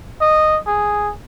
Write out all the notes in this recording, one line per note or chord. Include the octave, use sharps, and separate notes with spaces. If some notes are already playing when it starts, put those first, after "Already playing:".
D#5
G#4